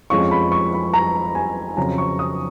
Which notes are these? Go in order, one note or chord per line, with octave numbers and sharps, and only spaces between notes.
F2 F3 G#3 C#4 F4 C#6
B5
C#6
B5
A#5
G#5
F2 C#3 F#3 C#4 F4 A#5
C#6
D#6